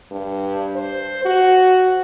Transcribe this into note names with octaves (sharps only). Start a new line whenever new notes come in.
G2
C5
F#4